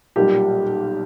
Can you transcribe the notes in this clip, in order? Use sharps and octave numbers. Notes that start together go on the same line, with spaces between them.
B1 A#2 G3 G4